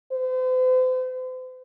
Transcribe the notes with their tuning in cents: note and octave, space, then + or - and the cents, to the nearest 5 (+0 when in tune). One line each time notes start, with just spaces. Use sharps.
C5 -40